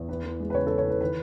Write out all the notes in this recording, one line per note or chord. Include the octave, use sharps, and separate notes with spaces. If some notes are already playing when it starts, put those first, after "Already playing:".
Already playing: E2
E3 B4
E3
G#3
B4
C#3 C#5
A4
C#3
C#5
E3 B4
D#3 B4